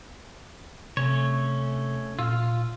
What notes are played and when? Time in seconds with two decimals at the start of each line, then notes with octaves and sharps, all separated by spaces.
0.97 C3 A3 C#4 C#5
2.19 A#2 F4 E6 F6